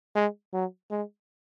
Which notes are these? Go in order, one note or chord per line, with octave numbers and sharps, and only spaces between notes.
G#3
F#3
G#3